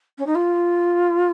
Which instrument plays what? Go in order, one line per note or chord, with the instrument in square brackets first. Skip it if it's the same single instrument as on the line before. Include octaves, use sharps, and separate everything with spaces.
[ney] C#4
D#4
F4